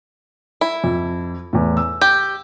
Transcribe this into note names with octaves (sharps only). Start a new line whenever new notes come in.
E4
F2
E2 A2
E6
G4